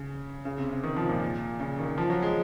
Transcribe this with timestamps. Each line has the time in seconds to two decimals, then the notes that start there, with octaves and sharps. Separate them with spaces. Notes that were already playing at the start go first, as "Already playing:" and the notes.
Already playing: C#3
0.45 C#3
0.58 C3
0.71 C3
0.84 D#3
0.96 F3
1.09 A#2
1.60 C#3
1.79 D#3
1.98 F3
2.10 F#3
2.22 G#3